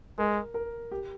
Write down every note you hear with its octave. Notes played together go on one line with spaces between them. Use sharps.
G#3 A#4
A#4
G4